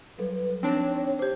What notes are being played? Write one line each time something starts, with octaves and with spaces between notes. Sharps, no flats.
F#3 G3 A4 B4
B4
F3 C4 D4 D#4 C#5 A#6
G4 C5 D6 G#6